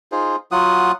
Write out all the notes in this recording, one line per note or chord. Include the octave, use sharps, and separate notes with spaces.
D#4 F4 G#4 C5
F#3 F4 F#5 D#6